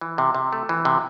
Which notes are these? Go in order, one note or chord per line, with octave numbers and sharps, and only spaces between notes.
E3
C3
C3
A3
E3
C3